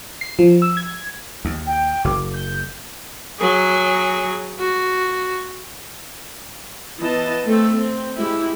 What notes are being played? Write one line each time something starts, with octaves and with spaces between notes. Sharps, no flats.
C7
F3
E6
G#6
D#2
G5
F#1 D6
G6
F#3 G#4
F#4
E3 B3 D#5 A5
A3 C4 A4
C4
G#3 E4 G4